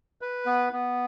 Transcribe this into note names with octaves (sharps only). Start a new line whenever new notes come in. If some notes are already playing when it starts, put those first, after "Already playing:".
B4
B3
B3